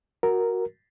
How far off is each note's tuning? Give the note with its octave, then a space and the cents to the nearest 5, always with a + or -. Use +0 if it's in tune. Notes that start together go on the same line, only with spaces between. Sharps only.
F#4 +0 A#4 +0